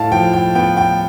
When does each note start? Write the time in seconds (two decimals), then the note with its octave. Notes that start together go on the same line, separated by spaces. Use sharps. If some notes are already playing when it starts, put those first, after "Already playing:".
Already playing: A2 E4 F5 A5
0.12 F3 G5
0.33 G5
0.55 B3 G5
0.77 G5